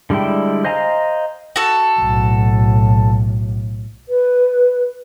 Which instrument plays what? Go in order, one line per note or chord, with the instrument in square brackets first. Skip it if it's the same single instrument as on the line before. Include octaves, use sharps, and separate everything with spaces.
[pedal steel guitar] D3 G3 G#3 E4 G5
C5 D#5 F5 G#5 A#5
[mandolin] F#4 A4
[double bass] B1 A2
[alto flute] B4